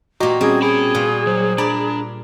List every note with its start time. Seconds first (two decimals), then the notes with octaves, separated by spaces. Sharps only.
0.20 A#2 F#4 G4 D#5 A#5
0.41 G3 C4 C#4 G#4
0.62 F#4 G#4 B5
0.95 A#2
1.27 F#3 C5
1.58 D4 D5 A#5 B5